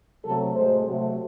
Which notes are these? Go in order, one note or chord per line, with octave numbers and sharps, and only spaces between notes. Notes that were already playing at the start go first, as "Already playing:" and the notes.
C3 F#3 A3 A4
A2 G#3 C5
C3 F#3 A3